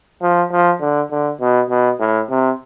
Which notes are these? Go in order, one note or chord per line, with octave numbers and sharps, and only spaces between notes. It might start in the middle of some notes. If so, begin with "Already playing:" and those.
F3
F3
D3
D3
B2
B2
A2
C3